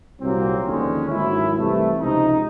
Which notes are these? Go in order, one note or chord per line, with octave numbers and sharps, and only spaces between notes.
C2 A#2 F#3 A#3 C4
D#2 D3 F3 G#3 C#4
G#2 D#3 F#3 E4
C2 C3 E3 A3
C#2 C3 F3 D#4